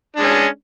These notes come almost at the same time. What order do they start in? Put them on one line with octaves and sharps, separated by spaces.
D4 G#3 C#4